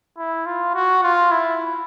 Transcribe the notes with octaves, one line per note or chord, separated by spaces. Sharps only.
E4
F4
F#4
F4
E4